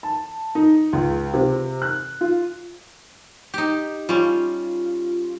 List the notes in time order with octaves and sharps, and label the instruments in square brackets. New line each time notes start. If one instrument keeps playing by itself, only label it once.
[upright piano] A5
D#4
C#2
C3
F#6
F4
[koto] D#4 G4
[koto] G3 C#4 [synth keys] F4